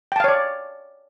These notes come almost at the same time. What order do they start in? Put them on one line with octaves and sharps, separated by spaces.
G5 A5 F5 C#5 D5